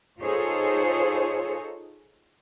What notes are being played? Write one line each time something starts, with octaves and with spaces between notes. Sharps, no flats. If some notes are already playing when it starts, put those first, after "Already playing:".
D#4 F4 G#4 A4 C5 C#5